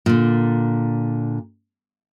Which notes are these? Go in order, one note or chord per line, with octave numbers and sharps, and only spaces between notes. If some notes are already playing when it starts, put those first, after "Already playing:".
A#2 D3